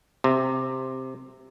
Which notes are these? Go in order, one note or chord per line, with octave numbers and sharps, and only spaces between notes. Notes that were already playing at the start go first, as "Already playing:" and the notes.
C3